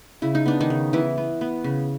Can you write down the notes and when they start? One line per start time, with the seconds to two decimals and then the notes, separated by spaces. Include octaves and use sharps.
0.22 C#3 E4
0.35 D#4
0.46 B3 D4
0.60 D#3 D#4
0.70 C#3
0.93 E3 B3 E4
1.18 B3
1.41 B3
1.64 C#3